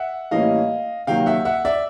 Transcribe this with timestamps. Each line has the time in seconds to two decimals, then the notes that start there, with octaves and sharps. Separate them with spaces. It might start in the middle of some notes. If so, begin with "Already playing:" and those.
Already playing: E5 F#5
0.31 A2 E3 G3 A#3 C#4 D#5 F5
1.07 C3 D#3 F#3 A#3 F5 G5
1.26 E5 F#5
1.45 E5 F#5
1.65 D5 E5